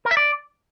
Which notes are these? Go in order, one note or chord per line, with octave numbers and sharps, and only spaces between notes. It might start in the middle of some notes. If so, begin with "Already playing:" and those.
A#4
E5
D5